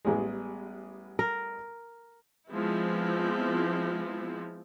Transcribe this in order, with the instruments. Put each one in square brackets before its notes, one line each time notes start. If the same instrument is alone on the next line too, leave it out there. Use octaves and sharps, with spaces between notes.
[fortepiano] A1 G#3 [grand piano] G3 B3 G#4
[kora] A#4
[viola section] F3 G#3 B3 C4 E4